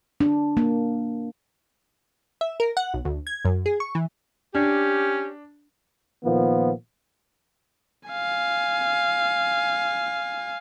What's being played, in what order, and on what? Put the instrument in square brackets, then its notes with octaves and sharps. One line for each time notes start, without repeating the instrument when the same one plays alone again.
[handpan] D4
A#3
[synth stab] E5
A#4
F#5
B1
D2
G#6
F#2
G#4
C#6
E3
[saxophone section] C#4 G4 [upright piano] D4
[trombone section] A#2 D#3 F3 B3
[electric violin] F5 G#5